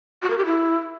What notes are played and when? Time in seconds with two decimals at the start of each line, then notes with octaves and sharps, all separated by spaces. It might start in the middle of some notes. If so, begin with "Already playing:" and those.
0.22 F#4
0.30 A#4
0.38 G4
0.46 E4